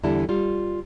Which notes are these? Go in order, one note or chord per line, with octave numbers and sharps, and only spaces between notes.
E2 D3 E3 G3 E4 A5
G3 F4